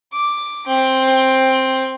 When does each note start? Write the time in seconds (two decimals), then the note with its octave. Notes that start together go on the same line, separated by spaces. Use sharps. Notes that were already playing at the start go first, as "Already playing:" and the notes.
0.12 D6
0.67 C4